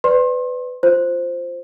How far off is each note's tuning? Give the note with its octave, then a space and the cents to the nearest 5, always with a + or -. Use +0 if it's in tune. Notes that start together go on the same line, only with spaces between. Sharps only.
B4 +25 D5 +0 C6 +35
F4 +0 C5 +0